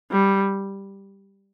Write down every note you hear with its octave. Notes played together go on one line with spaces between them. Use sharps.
G3